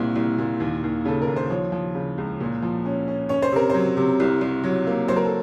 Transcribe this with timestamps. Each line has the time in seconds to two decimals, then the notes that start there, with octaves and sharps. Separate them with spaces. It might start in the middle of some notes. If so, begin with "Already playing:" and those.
Already playing: C2 A#2 C4
0.16 C2
0.38 A#2
0.60 D#2
0.84 D#2
1.05 C#3 A4
1.22 A#4
1.28 D#2
1.36 C5
1.50 F3 C#5
1.72 F3
1.95 C#3
2.18 C#2
2.40 A#2
2.62 F3
2.85 C#4
3.08 C#4
3.29 C#4 C#5
3.42 C5
3.52 C3 A#4
3.70 F#3 C5
3.97 C3
4.20 C2
4.41 C2
4.64 F#3
4.87 A#3
5.08 F#3 C5
5.16 A#4
5.25 A4